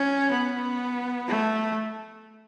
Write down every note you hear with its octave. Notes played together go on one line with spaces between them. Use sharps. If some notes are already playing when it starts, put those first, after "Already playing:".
Already playing: C#4
B3
A3